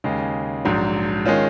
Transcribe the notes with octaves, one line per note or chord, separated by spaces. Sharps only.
D#2 C#3 G#3
A#1 G#2 F#3
D#3 G#3 C#4 F4